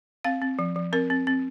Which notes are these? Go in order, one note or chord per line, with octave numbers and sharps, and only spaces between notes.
C4 F5
C4
F3
F3
C4 A#4
C4
C4